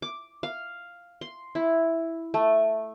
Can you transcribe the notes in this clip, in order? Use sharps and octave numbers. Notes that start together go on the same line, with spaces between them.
D6
F5
C6
E4
A3